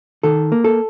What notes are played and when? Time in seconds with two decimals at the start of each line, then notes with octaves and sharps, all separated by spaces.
0.23 D#3 A4
0.52 A#3
0.64 A4